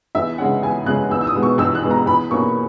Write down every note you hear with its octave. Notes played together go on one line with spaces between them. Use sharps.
E2 E5
C#3 G#3 C#4 F#5
E2 G#5
C#3 G#3 C#4 F#6
E2 E6
E6
D#6
B2 G#3 B3
C#6
E2 E6
F#6
B2 G#3 B3
A#5
E2 B5
B2 A#3 C#4 C#6